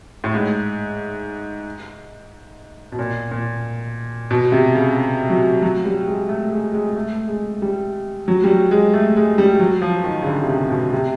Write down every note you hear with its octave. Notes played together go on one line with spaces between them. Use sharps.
A2
G#2
B2
A#2
A#2
B2
C3
C#3
F#3
F#3
G3
G#3
A3
G#3
G#3
A3
G#3
G3
F#3
G3
F#3
G#3
A3
G#3
G3
F#3
F3
D#3
C#3
D3
C3
C#3
B2
C3